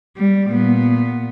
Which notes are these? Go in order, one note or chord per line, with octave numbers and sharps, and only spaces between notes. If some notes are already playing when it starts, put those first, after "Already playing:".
G3
A#2 B3